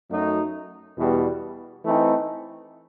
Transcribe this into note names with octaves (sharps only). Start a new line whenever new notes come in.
F#2 F#3 A3 D#4
E2 B2 G3
E3 A3 C4 D#4